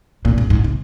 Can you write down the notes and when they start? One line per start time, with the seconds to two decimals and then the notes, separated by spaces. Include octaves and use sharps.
0.25 A#2
0.38 G#2
0.50 G#2
0.64 C3